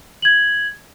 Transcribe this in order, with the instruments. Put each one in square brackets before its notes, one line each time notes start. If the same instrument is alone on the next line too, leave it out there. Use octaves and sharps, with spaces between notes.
[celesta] G#6 F#7